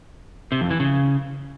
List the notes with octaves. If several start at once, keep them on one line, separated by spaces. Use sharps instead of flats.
C3
F2
E3
C#3